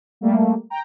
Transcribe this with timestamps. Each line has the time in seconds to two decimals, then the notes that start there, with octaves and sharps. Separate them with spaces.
0.21 G3 A3 A#3
0.70 G5 A#5